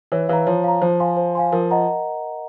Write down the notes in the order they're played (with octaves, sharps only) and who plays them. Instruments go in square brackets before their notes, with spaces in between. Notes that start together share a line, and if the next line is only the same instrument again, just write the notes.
[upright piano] E3 [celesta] C#5
[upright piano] E3 [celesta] F5 A#5
[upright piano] F3 [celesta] C#5
[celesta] F5 A#5
[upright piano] F3 [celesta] C5
[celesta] F5 G#5 C6
C5
F5 G#5 C6
[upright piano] F3 [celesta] A#4
[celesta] D#5 F#5 A#5